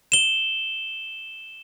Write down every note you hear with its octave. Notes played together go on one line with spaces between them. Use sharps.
E7 G7